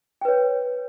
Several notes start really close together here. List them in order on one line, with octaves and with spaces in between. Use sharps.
G5 B4 C#5